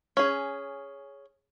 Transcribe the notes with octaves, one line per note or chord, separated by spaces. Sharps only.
C#4 G#4